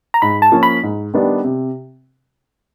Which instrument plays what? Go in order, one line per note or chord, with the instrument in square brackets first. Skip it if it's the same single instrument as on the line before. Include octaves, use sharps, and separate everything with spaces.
[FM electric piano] A#5
[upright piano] G#2 [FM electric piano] B5
[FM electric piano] A5
[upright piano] F3 A#3 C#4
[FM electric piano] B5
[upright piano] G#2
D#3 G3 B3 D4
C3